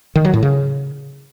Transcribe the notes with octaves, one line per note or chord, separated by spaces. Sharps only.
D#3
F#3
A2
C#3